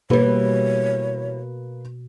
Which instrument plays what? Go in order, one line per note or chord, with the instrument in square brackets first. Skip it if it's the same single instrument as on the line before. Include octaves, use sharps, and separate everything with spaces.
[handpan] B2 [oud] E3 G3 [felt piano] A#3 B4 [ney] C#5